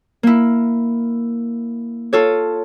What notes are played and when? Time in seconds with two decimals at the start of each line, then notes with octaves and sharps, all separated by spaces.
0.23 A#3 E4
2.13 F4 A4 C#5